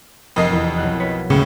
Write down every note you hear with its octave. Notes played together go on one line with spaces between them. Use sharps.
F1 F2 A#4 D#5 D#6 C7
F1 E2
B1 F5 F#6
B4 C#5
D#2 A2 C#3 G#3 C#7